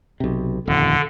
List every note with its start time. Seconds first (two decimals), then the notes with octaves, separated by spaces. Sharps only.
0.20 B1 C3
0.67 D#1 F2 D3